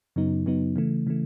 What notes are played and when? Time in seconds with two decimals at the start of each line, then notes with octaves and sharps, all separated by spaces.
0.16 F#2 C#3 F#3 B3 D#4
0.46 F#2 C#3 F#3 B3 D#4
0.76 C#3 E3 A3
1.07 C#3 E3 A3